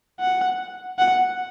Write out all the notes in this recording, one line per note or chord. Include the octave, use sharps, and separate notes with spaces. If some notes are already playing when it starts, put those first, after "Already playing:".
F#5
F#5